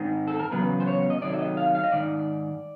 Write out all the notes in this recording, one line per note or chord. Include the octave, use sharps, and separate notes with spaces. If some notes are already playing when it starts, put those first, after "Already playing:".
Already playing: G#2 D#3 G#3 C4
A4
A#4
E2 C#3 F#3 B3 B4
C5
C#5
D#5
C3 D#3 F#3 A3 D5
E5
D#5
F5
F5
D#5
G#2 D#3 D5